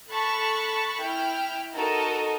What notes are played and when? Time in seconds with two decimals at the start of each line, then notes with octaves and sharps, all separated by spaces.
0.11 A4 A5 B5 C#6 F#6
1.02 E4 G5 F6
1.73 D#4 F#4 A4 A#4 D#5